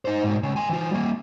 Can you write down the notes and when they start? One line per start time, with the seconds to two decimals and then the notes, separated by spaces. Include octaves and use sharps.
0.05 D#4 C5
0.23 G#2 B2
0.43 C#2 C#3
0.56 G#5 C6
0.69 E3 F4
0.91 G3 A#3